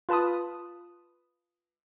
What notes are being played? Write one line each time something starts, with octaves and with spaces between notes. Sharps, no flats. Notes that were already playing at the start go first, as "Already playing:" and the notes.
F4 B4 A5 B5 D#6